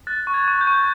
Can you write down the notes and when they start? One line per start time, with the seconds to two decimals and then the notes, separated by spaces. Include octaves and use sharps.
0.07 F#6 A6
0.27 C#6
0.34 G#6
0.48 C#6
0.61 G6
0.67 C#6